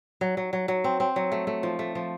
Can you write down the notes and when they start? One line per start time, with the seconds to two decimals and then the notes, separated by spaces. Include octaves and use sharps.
0.21 F#3
0.37 F#3
0.53 F#3
0.68 F#3
0.84 C4
1.00 C4
1.16 F#3
1.32 A3
1.47 A3
1.63 F3
1.79 A3
1.95 F3